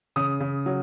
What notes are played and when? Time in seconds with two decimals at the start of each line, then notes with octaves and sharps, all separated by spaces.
0.16 C#3 D#6
0.40 C#3
0.66 F#3